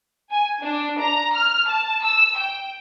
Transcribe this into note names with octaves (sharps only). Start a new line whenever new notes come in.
G#5
D4
A#5
F6
A5
E6
G5